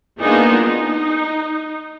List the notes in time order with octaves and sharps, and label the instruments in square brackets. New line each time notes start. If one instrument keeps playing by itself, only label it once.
[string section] A#3 B3 D4 D#4 F4 G#4
D#4